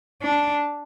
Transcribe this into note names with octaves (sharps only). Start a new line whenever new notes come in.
D4